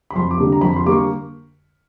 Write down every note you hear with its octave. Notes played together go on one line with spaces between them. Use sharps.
B5
F2 C6
D6
D3 G3 A#3
A#5
F2 B5
C6
D3 G3 A#3 D6
C#6